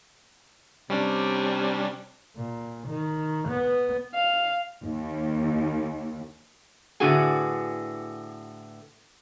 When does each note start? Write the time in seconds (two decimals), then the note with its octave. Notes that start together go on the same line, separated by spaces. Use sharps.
0.90 C3 G3 C#4 D4
2.37 A#2
2.87 D#3
3.48 B3
4.14 F5
4.84 D#2
7.00 A2 D3 B3 F#4 G#4 G#5